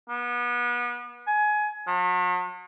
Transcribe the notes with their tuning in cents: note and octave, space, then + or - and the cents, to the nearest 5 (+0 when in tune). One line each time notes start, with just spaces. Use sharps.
B3 -30
G#5 +20
F#3 -45